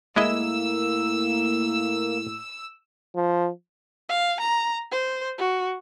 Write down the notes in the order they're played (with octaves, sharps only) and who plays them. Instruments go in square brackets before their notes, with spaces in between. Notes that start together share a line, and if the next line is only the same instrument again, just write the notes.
[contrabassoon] A2 [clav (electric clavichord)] G#3 E4 D#5 [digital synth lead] A#3 [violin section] E6
[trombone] F3
[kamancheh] F5
A#5
C5
F#4